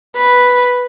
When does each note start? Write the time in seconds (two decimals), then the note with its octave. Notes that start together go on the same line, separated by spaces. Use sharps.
0.17 B4